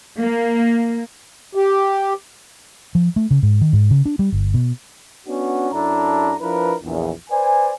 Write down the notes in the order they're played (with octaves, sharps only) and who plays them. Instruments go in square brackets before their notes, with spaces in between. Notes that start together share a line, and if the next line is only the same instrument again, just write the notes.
[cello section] A#3
[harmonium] G4
[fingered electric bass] F3
A3
C#3
G#2
D#3
G#2
C#3
D4
G3
G1
B2
[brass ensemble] B3 C#4 D4 F#4
F#2 D4 E4 A4 A#5
F3 D4 E4 A#4 B4
A#1 E2
B4 C5 D5 G#5